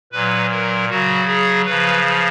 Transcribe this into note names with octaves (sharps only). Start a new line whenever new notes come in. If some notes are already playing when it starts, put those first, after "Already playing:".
A#2 F#3 B4
A#4
C#3 F#3 F#4
G#4
C#3 F3 B4